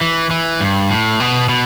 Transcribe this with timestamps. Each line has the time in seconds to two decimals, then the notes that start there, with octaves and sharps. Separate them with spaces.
0.01 E3
0.31 E3
0.60 G2
0.90 A2
1.20 B2
1.49 B2